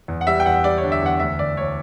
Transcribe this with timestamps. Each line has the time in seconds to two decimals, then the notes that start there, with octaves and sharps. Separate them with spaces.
0.08 E2
0.21 F#5
0.27 G3 E5
0.40 G5
0.46 E2 F#5
0.64 G3 D5
0.78 C#5
0.83 D3
0.92 E5
1.02 E2 F#5
1.20 D2 E5
1.39 D2 D5
1.57 D2 C#5